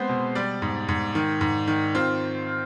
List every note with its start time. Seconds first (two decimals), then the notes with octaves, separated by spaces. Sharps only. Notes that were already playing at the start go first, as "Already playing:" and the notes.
Already playing: G#3 B3 C4 C5
0.09 B2
0.35 G3 D5
0.62 G#2
0.89 G#2
1.15 D#3
1.41 G#2
1.68 D#3
1.95 C4 F4